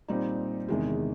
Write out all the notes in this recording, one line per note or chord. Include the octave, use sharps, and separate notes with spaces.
A#2 G3 C4 D#4
E2 C3 D#3 G#3